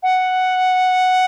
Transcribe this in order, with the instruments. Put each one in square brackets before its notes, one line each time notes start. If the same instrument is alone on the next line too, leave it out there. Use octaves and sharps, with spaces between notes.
[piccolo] F#5